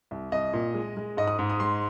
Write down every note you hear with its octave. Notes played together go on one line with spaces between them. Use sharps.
C2
C2 D#5
A#2
G#3
G#3
G#2 D#5
D#6
G#2
D#6
G#3 C6